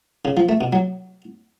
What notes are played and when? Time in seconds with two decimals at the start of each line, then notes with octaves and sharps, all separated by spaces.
0.25 C#3
0.37 F3
0.49 A3
0.61 B2
0.73 F#3